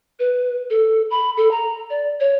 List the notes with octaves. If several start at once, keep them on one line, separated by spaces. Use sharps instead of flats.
B4
A4
B5
A4
A#5
D5
C#5